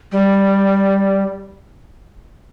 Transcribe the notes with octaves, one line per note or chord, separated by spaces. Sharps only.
G3